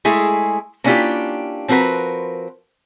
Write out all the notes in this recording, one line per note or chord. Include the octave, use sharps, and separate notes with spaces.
G#3 A3 E4 G#4
A#3 C#4 D4 E4 F4 G4
F3 C4 F#4 A#4 B4